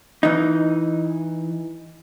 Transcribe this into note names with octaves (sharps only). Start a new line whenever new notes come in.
E3 D#4